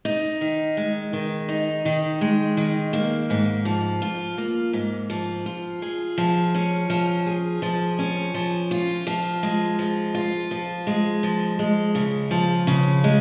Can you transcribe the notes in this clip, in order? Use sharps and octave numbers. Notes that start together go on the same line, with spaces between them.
D#4
D#3
G#3
D#3
D#4
D#3
G#3
D#3
A#3
G#2
F3
F4
A#3
G#2
F3
F4
G#4
F3
C#4
F3
G#4
F3
C#4
F3
F4
F3
G#3
F3
F4
F3
G#3
F3
G#3
C#3
F3
C#3
G#3